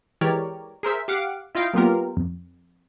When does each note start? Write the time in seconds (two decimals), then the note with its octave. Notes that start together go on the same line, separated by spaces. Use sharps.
0.21 E3 G#3 G4 A#4 C#5 D5
0.83 G#4 A#4 C5 E5
1.08 G4 F5 F#5 D6
1.55 E4 F4 D#5 F5 G5
1.74 F#3 A#3 B3 F4 G4 A#4
2.17 F2